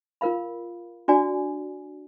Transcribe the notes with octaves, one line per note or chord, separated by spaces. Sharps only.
F4 A#4 F5 B5
D4 F#4 D5 G#5